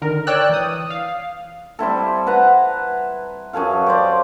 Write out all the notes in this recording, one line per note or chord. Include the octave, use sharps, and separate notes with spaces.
D3 D#3 A#4
C#5 D5 G5 E6 F#6
E3 D#6
F5
G3 C4 E4 A4
B4 F#5 A5 A#5
F#2 G#4 A4 F5
G4 C5 D5